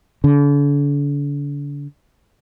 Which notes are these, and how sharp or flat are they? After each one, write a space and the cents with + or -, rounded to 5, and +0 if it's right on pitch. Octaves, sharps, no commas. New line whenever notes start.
D3 -40